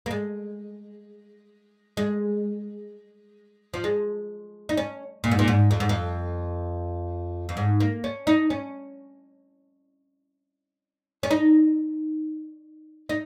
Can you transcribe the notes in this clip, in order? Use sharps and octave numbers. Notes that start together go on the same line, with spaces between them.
A#3
G#3
G#3
F3
G#3
D#4
C#4
A#2
G#2
A#2
G#2
F2
G#2
F2
F2
G#2
A#3
C#4
D#4
C#4
C#4
D#4
D#4